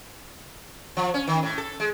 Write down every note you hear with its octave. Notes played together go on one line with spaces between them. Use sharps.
F3
C#4
D#3
A2
A4
G#3